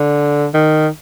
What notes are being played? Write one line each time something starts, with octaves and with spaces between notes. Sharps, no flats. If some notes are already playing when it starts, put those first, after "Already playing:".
Already playing: D3
D#3